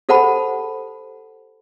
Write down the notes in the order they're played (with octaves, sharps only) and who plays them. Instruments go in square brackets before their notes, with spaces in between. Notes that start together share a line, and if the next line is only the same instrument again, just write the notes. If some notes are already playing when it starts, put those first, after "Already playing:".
[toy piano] G4 A4 C5 F#5 A5 B5